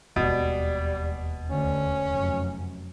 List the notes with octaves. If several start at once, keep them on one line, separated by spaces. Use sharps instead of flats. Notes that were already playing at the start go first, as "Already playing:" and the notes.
E1 D#2 B2 G3
D2 D3 C#4
F1 F#2